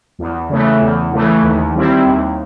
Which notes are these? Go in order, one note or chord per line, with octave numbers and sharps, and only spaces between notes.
E2
C#3 E3 A3
E2
C#3 E3 A3
D#2
D#3 G3 C4 E4
D#2